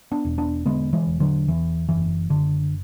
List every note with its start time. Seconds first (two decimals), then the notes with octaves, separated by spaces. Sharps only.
0.12 B3 D4
0.25 E1
0.38 B3 D4
0.66 D3 G#3 B3
0.93 E3 G#3
1.07 E1
1.20 D3 F#3
1.48 E2 E3
1.89 F#1 E3
2.30 F#1 D3